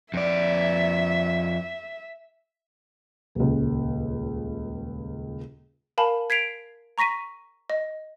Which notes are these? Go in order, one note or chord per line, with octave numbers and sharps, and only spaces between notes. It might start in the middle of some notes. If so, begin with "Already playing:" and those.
F2 D5 E5
D#1 C#2
A#4 F5 G#5 A5 B5
G#6 B6 C7 D7 F7
A#5 C#6 A#6 B6 D#7
D#5